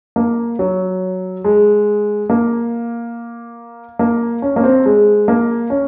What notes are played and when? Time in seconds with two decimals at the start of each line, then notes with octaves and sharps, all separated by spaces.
0.16 A#3
0.59 F#3
1.44 G#3
2.30 A#3
3.99 A#3
4.42 C#4
4.56 A#3
4.64 C4
4.86 G#3
5.28 A#3
5.70 C#4